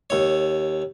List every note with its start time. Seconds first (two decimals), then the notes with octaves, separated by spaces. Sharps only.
0.10 D#2 C#5